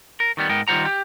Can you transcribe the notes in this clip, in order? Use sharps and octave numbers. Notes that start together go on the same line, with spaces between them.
A#4
D#3 G3 B3
G#2 B3 A#4 G5
D#3 G3 F4 C5 F#5 A#5
G4